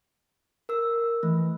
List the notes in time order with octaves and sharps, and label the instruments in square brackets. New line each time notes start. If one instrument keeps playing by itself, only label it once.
[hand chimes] A#4 E6
[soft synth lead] E3 [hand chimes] A3